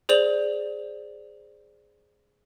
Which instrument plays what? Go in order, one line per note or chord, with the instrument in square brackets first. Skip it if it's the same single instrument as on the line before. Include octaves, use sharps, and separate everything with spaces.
[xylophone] G#4 C5 D5 F7 F#7